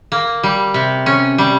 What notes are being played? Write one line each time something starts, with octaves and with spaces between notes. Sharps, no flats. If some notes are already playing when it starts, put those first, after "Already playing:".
A#3
G3
C3
C#4
G3